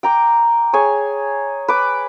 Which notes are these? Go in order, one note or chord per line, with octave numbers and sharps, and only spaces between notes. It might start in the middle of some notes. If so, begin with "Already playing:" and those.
G5 A#5 D6
G#4 C#5 G#5
B4 D6